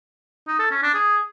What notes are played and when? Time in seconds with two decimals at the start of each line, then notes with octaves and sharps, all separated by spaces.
0.48 D#4
0.59 A4
0.71 C#4
0.83 D4
0.94 G#4